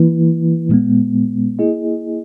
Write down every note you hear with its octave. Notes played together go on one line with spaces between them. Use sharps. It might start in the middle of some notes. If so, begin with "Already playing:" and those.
Already playing: E3 A#3 E4 B4
A#2 G#3 B3
A#3 E4 G#4 D#5